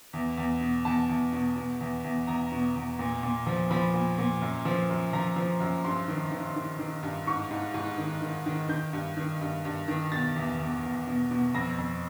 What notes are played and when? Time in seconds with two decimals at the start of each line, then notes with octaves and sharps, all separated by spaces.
0.13 E2
0.38 E2
0.61 B2
0.85 E2 A5
1.09 E2
1.33 B2
1.56 B2
1.80 E2
2.04 E2
2.27 E2 A#5
2.52 B2
2.75 E2
2.99 A#2
3.23 A#2
3.47 F3
3.70 F3 B5
3.94 A#2
4.18 A#2
4.42 F#2
4.65 F3
4.89 F#2
5.13 F3 A#5
5.36 F3
5.60 F#2
5.84 G2 C6
6.08 D#3
6.31 D#3
6.56 D#3
6.79 D#3
7.03 G2
7.27 G#2 C#6
7.51 G#2
7.74 G#2
7.98 D#3
8.22 D#3
8.46 D#3
8.69 D#3 G6
8.93 G2
9.17 D#3
9.41 G2
9.65 G2
9.88 D#3
10.12 B2 A6
10.36 E2
10.59 E2
10.83 E2
11.07 B2
11.31 B2
11.54 F2 A#6
11.78 F2